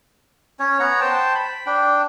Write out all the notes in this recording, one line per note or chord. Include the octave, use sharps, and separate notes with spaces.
C#4 C#5
B3 C#5 F#5 A#5
C5 G5 A5
B5
D4 G5